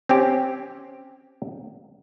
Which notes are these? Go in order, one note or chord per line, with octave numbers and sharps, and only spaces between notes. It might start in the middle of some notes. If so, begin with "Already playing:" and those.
C4 C#4 G4